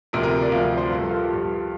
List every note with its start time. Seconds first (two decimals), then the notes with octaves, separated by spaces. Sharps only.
0.13 D2 C3 F3 A#4
0.23 A#4
0.42 D5
0.52 D2 C3 F3 F5
0.78 C5
0.90 G2 F3 A#4
1.00 A4
1.09 F4
1.19 G4
1.28 G2 F3